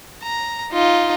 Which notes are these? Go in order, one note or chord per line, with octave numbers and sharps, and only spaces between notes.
A#5
D#4 F4